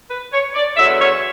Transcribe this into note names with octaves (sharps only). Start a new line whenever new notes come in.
B4
C#5
D5
E2 D3 F#3 E5
C#5